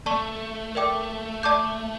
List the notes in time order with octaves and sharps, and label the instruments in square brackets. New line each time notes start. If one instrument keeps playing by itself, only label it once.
[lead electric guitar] A3 [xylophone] D5 A5 C#6
[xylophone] A#4 D5 G5 D6
D5 A5 D6 G6